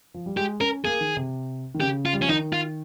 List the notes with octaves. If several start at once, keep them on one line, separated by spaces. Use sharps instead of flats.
F3
G3
G#3 G4
C#4 A#4
A#3 G#4
D#3
C3
D#3
C#3 G4
F4
G3
F3 C#4
D#3 D#4
F4